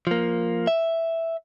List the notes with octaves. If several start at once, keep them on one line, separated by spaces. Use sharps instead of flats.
F3 A#3
E5